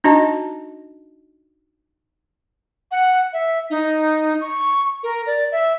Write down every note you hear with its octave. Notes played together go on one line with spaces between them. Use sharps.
D4 D#4 F#4 D#5 A5
F#5
E5
D#4
C#6
A#4
D5
E5